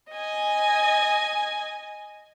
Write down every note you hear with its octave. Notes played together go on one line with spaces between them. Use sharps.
D#5 G#5